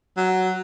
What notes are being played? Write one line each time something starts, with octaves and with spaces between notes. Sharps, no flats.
F#3